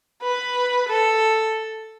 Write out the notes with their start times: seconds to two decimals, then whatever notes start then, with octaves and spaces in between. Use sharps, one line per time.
0.22 B4
0.88 A4